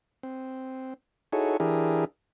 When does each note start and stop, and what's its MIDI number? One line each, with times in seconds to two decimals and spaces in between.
0.23 0.94 60
1.33 1.57 63
1.33 1.57 64
1.33 1.57 66
1.33 1.57 68
1.33 1.57 69
1.33 1.57 73
1.60 2.05 52
1.60 2.05 62
1.60 2.05 64
1.60 2.05 67
1.60 2.05 68
1.60 2.05 70